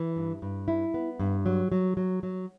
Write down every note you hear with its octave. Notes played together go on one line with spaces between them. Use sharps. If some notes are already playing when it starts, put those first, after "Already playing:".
Already playing: E3
G2
G2
E4
B3
G2
F#3
F#3
F#3
F#3